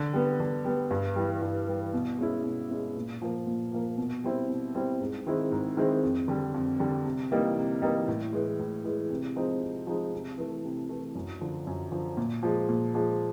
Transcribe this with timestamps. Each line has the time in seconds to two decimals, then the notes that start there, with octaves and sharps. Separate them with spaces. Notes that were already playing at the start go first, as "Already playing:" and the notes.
Already playing: D3
0.13 G3 B3
0.40 D3
0.65 G3 B3
0.91 G2
1.16 E3 G3
1.42 G2
1.67 E3 G3
1.94 B2
2.19 G#3 C#4 E4
2.44 B2
2.70 G#3 C#4 E4
2.95 A#2
3.22 F3 A#3
3.47 A#2
3.73 F3 A#3
3.97 B2
4.24 G3 C4 E4
4.49 B2
4.75 G3 C4 E4
5.01 G#2
5.26 D#3 G#3 C4 E4
5.52 G#2
5.77 D#3 G#3 C4 E4
6.03 F2
6.28 D3 G3
6.54 F2
6.80 D3 G3
7.06 C3
7.31 E3 G3 A#3 D#4
7.57 C3
7.82 E3 G3 A#3 D#4
8.08 A2
8.33 E3 G#3
8.59 A2
8.84 E3 G#3
9.10 C3
9.36 F3 G#3 C4 D#4
9.61 C3
9.87 F3 G#3 C4 D#4
10.13 C3
10.38 E3 A3
10.64 C3
10.89 E3 A3
11.15 F#2
11.41 D3 F3
11.67 F#2
11.92 D3 F3
12.17 A#2
12.43 F3 G#3
12.69 A#2
12.94 F3 G#3